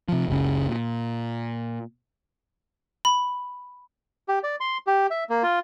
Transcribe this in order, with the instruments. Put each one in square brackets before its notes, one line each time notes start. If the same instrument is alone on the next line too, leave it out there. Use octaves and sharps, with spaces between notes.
[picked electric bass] C3 F3
F#1 C#2 F#2 C#3
A#2
[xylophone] B5
[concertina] G4
D5
C6
G4
E5
A#3
F4